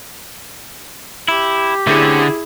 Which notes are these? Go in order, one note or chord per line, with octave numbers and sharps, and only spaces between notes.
E4 G4
D3 A3 C4 C#4 E4 G#4